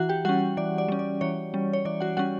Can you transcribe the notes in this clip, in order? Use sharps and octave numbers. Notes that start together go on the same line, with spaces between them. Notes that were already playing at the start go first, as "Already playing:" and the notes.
Already playing: E3 F#4 F#5
G4 G5
G3 C#4 F#4 F#5
E3 D5
D5
G3 C#4
D5
E3 C#5
G3 C#4
C#5
E3 D5
F#4 F#5
G3 C#4 F#4 F#5